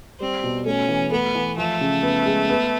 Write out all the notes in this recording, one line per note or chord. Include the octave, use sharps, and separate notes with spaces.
G3 C4
B2
A3 C#4
E3
A3 B3
E3
F3 A3
C#3
B3
G#3
B3